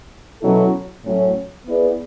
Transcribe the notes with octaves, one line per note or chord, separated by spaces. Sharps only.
B2 F#3 C#4 E4 A4
A2 F#3 C#4
B3 E4 G#4 B4 D5